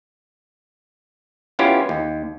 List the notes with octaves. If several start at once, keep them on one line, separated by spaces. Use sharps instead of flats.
B3 C#4 E4 F4 G4 C#5
D#2